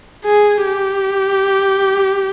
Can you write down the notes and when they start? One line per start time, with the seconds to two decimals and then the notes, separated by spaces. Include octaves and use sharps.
0.25 G#4
0.66 G4